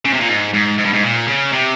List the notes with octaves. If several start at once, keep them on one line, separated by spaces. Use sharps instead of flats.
C#3
C3
A#2
G#2
G#2
G#2
G2
G#2
A#2
C#3
C3